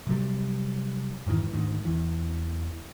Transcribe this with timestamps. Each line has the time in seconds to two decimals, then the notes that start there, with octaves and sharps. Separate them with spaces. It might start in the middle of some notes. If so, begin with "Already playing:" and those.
0.07 C3 F#3 G3
1.26 F2 G#2 D#3 E3
1.52 D2 G#2 D#3
1.85 E2 E3